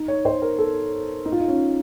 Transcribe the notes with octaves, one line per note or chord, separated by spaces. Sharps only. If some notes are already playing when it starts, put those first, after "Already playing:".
Already playing: D#4
C#5
C5
A#4
A4
D#4
F4
D#4
C#4